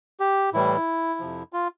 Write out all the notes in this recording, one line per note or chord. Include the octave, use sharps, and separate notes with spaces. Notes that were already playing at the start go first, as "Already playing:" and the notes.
G4
A2 E3 G3 E4
F2 C3 F3
F4